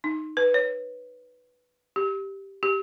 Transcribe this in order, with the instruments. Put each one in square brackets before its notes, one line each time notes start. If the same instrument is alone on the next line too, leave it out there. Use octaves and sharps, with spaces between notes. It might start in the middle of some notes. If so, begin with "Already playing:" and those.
[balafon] D#4
B4
C#5
G4
G4